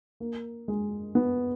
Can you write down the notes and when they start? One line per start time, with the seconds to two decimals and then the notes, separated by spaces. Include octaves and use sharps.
0.20 A#3
0.68 G#3
1.15 B3